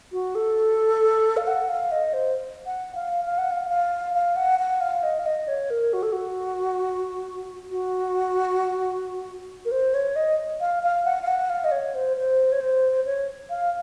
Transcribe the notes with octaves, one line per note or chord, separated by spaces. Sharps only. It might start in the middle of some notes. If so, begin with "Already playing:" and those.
F#4
A4
F5
F#5
F5
D#5
C5
F#5
F5
F5
F#5
F5
F5
F5
F#5
F#5
F5
D#5
F5
D#5
C#5
A#4
F#4
A4
F#4
F#4
A#4
C5
C#5
D#5
F5
F5
F#5
F5
F#5
F5
D#5
C#5
C5
C5
C#5
C5
C#5
F5